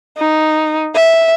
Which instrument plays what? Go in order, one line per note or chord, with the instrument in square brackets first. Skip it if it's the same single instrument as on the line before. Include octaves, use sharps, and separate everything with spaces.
[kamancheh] D#4
E5